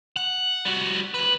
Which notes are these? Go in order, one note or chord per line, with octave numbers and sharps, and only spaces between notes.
F#5
G3 F#4
D#2 B4